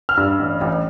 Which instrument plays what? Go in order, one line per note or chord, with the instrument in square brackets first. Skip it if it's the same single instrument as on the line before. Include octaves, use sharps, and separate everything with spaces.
[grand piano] F6
G2 E6
A1
A1